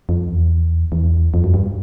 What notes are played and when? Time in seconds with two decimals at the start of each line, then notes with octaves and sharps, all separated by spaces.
0.09 F2
0.29 E2
0.92 E2
1.34 F2
1.44 F#2
1.54 G2